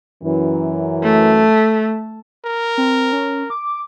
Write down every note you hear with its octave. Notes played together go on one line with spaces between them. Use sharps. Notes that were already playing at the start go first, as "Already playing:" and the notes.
F#2 E3
A3
A#4
C4
C#4
D6